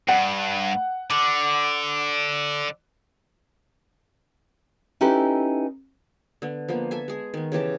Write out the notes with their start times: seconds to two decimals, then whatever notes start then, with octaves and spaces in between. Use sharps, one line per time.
0.08 G2 F#5
1.10 D3 D5
5.01 C#4 D#4 E4 G4 A4 B4
6.42 D3 B3
6.68 F3 A#3 B3
6.91 A4 E5 G#5
7.08 G#3 G#4
7.34 D#3 B3
7.52 C#3 E3 G4 A5